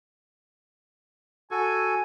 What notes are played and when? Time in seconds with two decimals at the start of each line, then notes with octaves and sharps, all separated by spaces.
1.51 F#4 A4 G#5